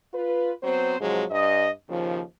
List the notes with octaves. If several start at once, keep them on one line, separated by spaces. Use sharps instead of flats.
F4 B4
F#3 B3 C4 C5
G#2 C3 F3 F#3 G#3
G2 D#5
D#2 C#3 F3